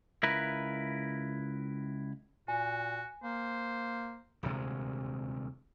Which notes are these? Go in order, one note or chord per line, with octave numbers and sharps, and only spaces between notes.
C#2 E4 A#4 B4
A#2 F#4 G#5
A#3 C5
D#1 D2 C3 G#3